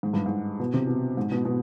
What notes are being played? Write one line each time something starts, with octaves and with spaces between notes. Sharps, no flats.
G#2
G2
G#2
B2
C3
B2
G#2
B2
B2